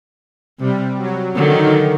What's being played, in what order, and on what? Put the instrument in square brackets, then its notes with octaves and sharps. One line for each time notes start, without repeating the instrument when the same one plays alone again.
[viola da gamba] C3 [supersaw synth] G3
[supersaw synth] F#3
[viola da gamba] D3 F#3 [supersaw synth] D#3